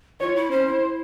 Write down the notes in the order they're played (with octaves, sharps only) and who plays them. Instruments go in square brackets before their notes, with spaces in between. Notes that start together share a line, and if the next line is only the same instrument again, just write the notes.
[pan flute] F4 [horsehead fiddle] C#5
[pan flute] E4
[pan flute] C#4 [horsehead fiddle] C5
[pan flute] E4